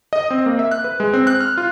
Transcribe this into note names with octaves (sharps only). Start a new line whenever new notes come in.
D#5
C4
A#3
E5
F#6
B4
G#3
C4
F#6
F6
F4